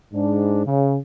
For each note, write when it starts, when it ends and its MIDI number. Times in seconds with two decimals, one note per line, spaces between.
0.14 0.62 44
0.14 0.62 62
0.66 0.98 49